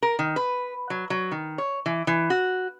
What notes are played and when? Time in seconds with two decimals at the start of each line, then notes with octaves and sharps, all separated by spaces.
0.02 A#4
0.19 D#3
0.36 B4
0.90 F#3
1.10 F#3
1.32 D#3
1.58 C#5
1.86 E3
2.07 E3
2.30 F#4